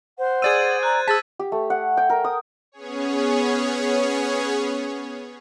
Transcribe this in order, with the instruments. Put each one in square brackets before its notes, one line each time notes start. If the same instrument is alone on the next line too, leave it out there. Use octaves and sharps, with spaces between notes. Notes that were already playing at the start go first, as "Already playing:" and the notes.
[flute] C5 [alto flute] F#5
[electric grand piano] G#4 D5 E6 [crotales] G#6 A6 D#7
[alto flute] A#5 [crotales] F#6
[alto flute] G#4 [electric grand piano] A5 [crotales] E6 A6 B6
[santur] G4
A3
F#5
G5
A#4
D#6
[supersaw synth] B3 C#4 G#4 C#5